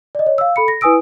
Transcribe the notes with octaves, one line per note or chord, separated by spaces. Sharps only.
D5 D#5
C#5
F5 E6
A4 B5 C#7
A#6
E4 B4 G#5 D#6 E6 D7